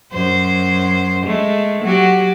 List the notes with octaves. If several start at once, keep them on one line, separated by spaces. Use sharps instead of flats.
F#2 C5
G#3 A3
F#3 F#4 G4